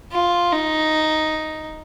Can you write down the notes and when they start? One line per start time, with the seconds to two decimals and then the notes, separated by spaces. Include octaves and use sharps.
0.12 F4
0.52 D#4